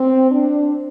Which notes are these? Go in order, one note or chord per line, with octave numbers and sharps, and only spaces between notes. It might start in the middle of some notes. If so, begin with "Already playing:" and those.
Already playing: C4
D4